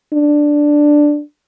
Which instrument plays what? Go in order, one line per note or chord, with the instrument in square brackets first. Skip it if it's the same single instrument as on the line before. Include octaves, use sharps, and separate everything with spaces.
[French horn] D4